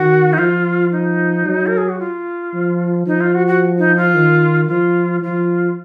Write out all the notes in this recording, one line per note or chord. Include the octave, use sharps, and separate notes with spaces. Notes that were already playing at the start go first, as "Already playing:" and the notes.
Already playing: D#3 F#4
D#4
F3 F4
D#4
F#3
A#4
G#4
F#4
F4
F3
F3 D#4
F4
F#4
F#4
D#4
F4
D#3
F3 F4
F3 F4